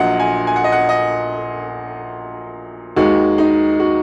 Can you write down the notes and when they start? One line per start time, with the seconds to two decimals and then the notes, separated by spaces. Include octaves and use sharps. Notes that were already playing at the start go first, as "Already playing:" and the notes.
Already playing: A#1 A#2 F#3 D#5 F#5
0.20 G#5
0.47 G#5
0.56 F#5
0.64 D#5
0.72 F#5
0.89 D#5
2.96 D#2 D#3 G#3 F#4
3.38 D#4
3.80 F#4